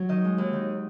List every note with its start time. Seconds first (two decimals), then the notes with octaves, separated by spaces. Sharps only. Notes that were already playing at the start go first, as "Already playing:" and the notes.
Already playing: F#3 C#4 C#5
0.09 D#3 D#5
0.24 G#3
0.38 D#2
0.53 D#3